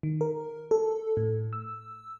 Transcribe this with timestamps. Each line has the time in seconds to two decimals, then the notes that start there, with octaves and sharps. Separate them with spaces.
0.03 D#3
0.21 A#4
0.71 A4
1.17 A2
1.53 E6